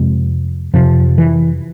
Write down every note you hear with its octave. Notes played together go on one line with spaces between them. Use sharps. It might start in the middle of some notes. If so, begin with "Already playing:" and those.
Already playing: F2 C3 G#3
F2 C3 F3
E3